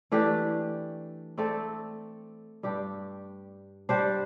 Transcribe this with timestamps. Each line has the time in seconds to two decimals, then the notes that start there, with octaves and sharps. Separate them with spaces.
0.12 E3 A3 D4 G4
1.38 A3 C4 A4 D5
2.63 G2 G3 D4 G4
3.89 G3 D4 C5